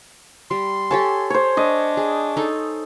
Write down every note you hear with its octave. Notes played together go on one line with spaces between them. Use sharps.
G3 C6
G4 A4 C#5 G#5 A5
C5 C#5
D4 D#5
G#4
D#4 A4